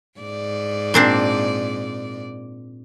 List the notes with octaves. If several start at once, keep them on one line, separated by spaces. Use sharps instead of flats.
G#2 D5
A#2 C4 D4